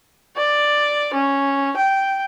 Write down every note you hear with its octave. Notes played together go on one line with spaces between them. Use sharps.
D5
C#4
G5